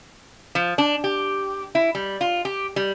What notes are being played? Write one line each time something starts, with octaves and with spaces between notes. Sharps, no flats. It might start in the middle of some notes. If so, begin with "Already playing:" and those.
F3
D4
G4
E4
G3
F4
G4
G3